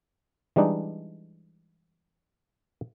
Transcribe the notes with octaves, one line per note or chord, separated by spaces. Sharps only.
E3 G3 G#3 D4 D#4